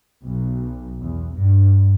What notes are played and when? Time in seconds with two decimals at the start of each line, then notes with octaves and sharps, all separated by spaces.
0.22 B1
0.98 E2
1.32 G2